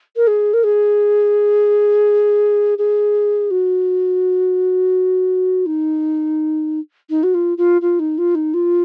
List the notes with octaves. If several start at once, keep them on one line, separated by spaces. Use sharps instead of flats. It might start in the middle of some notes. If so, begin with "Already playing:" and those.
A#4
G#4
A#4
G#4
G#4
F#4
D#4
D#4
F#4
F4
F4
F4
D#4
F4
D#4
F4